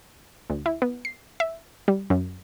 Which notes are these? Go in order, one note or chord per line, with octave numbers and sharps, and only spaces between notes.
D2
E4
B3
C7
E5
G3
F#2